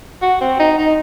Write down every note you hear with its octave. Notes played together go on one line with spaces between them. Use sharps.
F#4
C4
D#4
D#4